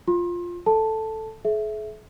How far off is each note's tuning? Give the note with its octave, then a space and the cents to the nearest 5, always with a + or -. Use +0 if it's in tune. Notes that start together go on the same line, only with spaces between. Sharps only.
F4 +0 C6 +30
A4 +0 A5 +0
G#4 +45 E5 +0